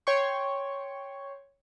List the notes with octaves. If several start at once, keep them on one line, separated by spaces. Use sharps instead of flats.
C#5 G5 C6 C#6